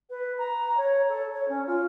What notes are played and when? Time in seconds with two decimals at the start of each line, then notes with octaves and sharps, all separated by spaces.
0.10 B4
0.38 A#5
0.77 C#5
1.09 A4
1.34 C#5
1.48 C#4
1.67 F4